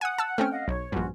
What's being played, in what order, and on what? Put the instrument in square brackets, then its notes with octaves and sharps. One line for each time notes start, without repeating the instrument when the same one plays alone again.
[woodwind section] F#5 [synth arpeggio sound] G#5 D#6
[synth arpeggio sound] A5 E6
[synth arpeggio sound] A3 C4 C#4 [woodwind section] G5 F6
[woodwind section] D#5 F5 F#5
[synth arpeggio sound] B1 [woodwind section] C#5
[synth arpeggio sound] A#1 G2 [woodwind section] C#4 F4 F#4